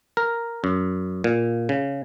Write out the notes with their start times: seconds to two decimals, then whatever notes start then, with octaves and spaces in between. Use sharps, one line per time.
0.17 A#4
0.64 F#2
1.24 A#2
1.69 C#3